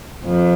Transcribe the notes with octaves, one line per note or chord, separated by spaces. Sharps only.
F2